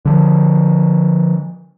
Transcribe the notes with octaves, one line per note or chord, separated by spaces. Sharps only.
D3 F3